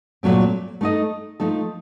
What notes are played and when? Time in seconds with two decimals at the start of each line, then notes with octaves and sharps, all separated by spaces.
0.23 A#2 F#3 A3 C4
0.81 A3 D#4 A4 D#5
1.40 F3 A3 D#4 A4